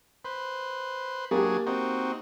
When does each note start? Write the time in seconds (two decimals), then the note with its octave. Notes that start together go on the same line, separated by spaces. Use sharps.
0.25 B4 C5
1.31 F#3 A#3 D4 G4 G#4
1.66 C4 D#4 F#4